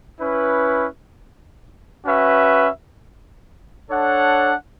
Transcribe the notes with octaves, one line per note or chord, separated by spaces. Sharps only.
C#4 E4 B4
C#4 F#4 B4 E5
D4 A4 C#5 F#5